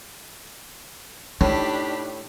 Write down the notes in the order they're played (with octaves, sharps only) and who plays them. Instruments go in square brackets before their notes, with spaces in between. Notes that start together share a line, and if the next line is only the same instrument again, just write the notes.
[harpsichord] A2 [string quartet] D4 G4 B5 [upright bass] D#4